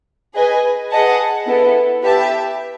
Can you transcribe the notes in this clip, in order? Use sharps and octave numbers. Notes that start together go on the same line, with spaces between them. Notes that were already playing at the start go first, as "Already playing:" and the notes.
G#4 B4 D#5 G#5
G#4 B4 D#5 F#5 A5
B3 E4 A4
G4 B4 E5 A5